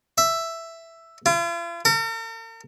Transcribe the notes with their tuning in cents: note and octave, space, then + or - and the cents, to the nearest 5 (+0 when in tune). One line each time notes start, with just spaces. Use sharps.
E5 +5
F4 -45
A#4 -45